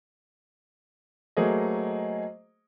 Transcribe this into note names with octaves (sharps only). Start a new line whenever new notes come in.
F#3 A3 A#3 G#4 C5 D#5